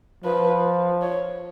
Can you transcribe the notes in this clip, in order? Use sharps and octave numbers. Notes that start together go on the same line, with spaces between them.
F3 B4
C#5